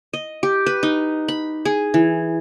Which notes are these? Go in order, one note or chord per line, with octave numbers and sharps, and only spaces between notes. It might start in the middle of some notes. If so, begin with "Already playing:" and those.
D#5
G4
B4
D#4
B5
G#4
E3